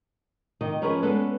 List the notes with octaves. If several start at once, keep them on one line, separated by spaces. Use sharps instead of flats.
C3 D#3 D#5
F3 C#4 G#4 A#4 B4 C#5
G#3 B3 C#4 A4 B4 D5